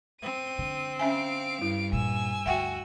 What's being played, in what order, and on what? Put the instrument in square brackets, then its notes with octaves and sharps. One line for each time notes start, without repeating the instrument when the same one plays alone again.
[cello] C4 [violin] D#7
[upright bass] D3
[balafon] C#4 E5 G#5 [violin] F5 D7
[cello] G2 [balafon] E4
[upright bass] A#2 [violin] G#5 E6
[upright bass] D2 [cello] F#4 [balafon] E5 F#5 G5